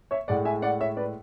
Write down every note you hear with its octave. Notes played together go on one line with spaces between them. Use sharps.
C#5 E5
A2 G#3 D5 F#5
E5 G#5
D5 F#5
C#5 E5
B4 D5